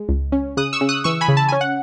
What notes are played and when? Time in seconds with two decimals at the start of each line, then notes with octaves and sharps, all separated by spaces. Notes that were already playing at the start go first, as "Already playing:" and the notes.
Already playing: G#3
0.09 C#2
0.32 C#4
0.57 C#3 D#6 F#6
0.73 C#6 E6
0.81 C#3
0.89 D#6 F#6
1.04 E3 C#6 E6
1.21 G#5 B5
1.28 C#3
1.37 A5
1.49 C#4 G#5
1.61 F#5